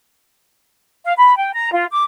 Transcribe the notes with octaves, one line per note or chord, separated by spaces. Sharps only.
F5
B5
G5
A#5
F4
D6